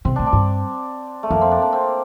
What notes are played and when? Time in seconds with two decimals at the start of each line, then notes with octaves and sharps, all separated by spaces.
0.05 C3 C4
0.16 A2 D4
0.26 D4
0.33 G2
1.23 A3
1.31 F2 A#3
1.41 C4
1.51 D4
1.62 D4
1.73 C4